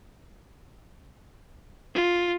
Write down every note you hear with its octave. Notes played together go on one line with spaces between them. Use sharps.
F4